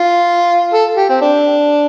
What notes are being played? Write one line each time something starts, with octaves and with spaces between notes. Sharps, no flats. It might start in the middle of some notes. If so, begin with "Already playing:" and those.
Already playing: F4
A4
G4
C4
D4